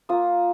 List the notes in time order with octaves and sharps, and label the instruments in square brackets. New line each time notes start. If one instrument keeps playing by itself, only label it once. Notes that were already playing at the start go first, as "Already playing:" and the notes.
[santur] A#3 F4 D#6